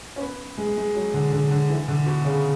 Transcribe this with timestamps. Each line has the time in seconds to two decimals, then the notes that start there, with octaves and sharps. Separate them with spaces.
0.16 C#4
0.21 B3
0.57 G#3
0.77 G#3
0.95 F#3
1.14 D3
1.32 D3
1.51 D3
1.69 E3
1.88 D3
2.06 B2
2.25 C#3